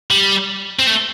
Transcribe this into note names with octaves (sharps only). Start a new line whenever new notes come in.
G3
C4
A3